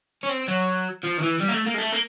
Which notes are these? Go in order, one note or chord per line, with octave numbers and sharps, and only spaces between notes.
C#4
C4
F#3
F3
D#3
E3
G3
A#3
A3
A#3
G#3
A3
A#3